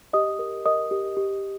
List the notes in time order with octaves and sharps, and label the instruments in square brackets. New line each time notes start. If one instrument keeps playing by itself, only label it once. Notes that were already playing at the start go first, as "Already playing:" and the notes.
[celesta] G4 D#5 D#6
A#4
A#4 D#5 D#6
G4
G4